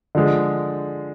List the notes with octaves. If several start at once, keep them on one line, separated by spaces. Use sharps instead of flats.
D3 F3 G#3